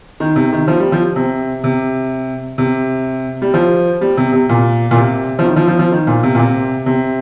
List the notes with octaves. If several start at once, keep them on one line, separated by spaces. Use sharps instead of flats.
D#3
C3
D#3
F3
G3
F3
C3
C3
C3
G3
F3
G3
C3
C3
A#2
A#2
C3
F3
D#3
F3
F3
F3
D#3
A#2
C3
A#2
C3
C3